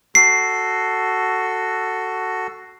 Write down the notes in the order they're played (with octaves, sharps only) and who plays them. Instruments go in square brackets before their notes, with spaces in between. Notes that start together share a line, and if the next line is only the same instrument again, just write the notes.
[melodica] F#4 A4 [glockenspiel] C7